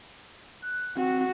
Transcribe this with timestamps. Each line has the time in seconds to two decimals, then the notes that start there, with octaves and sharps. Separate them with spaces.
0.62 F#6
0.97 C4 F#4